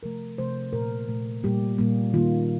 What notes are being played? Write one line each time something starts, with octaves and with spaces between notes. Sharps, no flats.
C3 F3 A3 A#4
C3 F3 A3 C5
A#2 A3 A#4
A#2 A3
A#2 G3 A#3 G4
A#2 G3 A#3
D#3 G3 A#3 F4